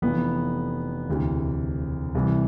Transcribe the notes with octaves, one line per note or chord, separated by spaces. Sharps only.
F1 F2 E3 B3
E1 D2 C3 E3
C2 C3 E3